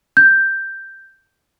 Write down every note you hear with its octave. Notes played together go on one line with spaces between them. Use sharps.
G6